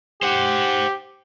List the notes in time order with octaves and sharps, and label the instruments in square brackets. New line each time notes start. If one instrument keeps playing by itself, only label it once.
[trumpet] G4 [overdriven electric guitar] C5 F#5